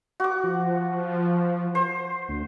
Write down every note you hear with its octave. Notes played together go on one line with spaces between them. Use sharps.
F#4 D6
F3
C5
D2